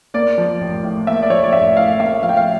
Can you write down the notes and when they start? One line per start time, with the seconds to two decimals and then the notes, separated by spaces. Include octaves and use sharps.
0.14 A#3 D5
0.38 F3
0.60 A1
0.83 A2
1.07 A#3 E5
1.22 D5
1.30 F3 C#5
1.44 D5
1.53 A1 E5
1.77 A2 F5
1.99 A#3 E5
2.23 F3 F5
2.29 G5
2.37 F5